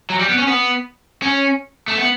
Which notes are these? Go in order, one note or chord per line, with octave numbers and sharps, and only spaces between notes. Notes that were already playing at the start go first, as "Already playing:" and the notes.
F#3
G3
B3
C#4
B3
C#4
A3
B3